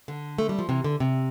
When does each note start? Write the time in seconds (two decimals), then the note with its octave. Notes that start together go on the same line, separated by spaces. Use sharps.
0.08 D3
0.38 A3
0.49 G3
0.59 F3
0.69 C3 E3
0.84 D3
1.00 C3